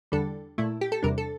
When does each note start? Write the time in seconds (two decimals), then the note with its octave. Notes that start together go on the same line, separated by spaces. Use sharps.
0.12 E2 D3 G3 D4 A4
0.58 A#2 A3 E4
0.81 G4
0.92 A4
1.03 E2 C3 G3 D4 A#4
1.18 A4